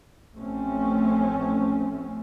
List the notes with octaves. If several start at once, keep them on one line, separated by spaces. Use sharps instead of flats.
A1 F2 A2 A3 C4 C#4